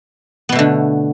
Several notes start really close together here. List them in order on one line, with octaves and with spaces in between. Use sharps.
B3 B2 A3 D3